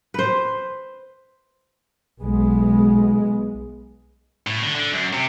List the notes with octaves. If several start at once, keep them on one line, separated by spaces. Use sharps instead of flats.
B4 C5
B1 G#3 B3
A2
D3
D3
F#2
C3